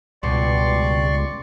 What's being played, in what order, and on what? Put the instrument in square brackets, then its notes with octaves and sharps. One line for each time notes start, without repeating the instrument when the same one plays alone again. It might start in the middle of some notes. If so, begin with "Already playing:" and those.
[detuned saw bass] C#2 [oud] G2 B2 [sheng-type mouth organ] D5 C6 C#6